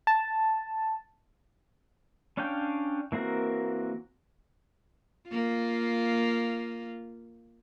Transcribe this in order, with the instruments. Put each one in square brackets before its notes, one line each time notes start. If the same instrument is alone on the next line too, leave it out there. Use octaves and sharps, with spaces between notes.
[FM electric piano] A5
[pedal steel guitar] C#4 D4 C#5 F5 G5
E3 A#3 C4 F#4 A#4
[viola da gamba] A#3 F4